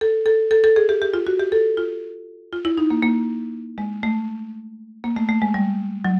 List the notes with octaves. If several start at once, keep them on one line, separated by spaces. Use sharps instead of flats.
A4
A4
A4
A4
G#4
G4
G4
F4
F#4
G4
A4
F4
F4
E4
D#4
A#3
A#3
G#3
A3
A#3
A3
A3
G#3
G3
F#3